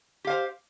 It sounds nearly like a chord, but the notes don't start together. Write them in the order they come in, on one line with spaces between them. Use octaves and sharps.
G4 F5 C5